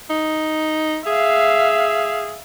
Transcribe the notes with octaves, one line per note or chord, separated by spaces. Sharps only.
D#4
G#4 E5 F5